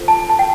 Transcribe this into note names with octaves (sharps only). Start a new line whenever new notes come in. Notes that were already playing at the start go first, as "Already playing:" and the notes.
Already playing: F4 A4 C5
A5
A5
G5